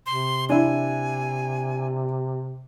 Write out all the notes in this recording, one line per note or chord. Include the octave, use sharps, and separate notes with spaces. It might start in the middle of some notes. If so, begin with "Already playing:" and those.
C3 C6
D4 E4 G#5